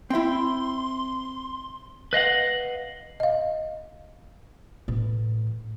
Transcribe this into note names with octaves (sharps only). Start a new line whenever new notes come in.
C4 E4 E5 G5 C6
B4 D#5 F5 F#5
D#5 F5
A2 E3